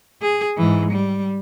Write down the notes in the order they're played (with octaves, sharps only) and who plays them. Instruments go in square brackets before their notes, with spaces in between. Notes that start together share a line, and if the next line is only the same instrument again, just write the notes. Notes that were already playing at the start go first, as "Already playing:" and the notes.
[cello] G#4
G#2 E3
G3